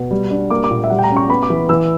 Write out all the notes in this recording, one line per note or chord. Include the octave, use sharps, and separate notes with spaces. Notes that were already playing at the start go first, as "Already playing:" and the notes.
Already playing: B2
G3
D4
A#3 D6
D6
A#2
E5
G3 F#5
G5
A#5
C#4
C#6
B3 B5
D6
E3
E3 E6